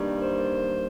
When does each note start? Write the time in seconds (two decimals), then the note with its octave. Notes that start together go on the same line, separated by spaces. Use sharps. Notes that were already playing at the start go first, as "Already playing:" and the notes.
Already playing: G2 D#3 G3 A#3
0.20 C5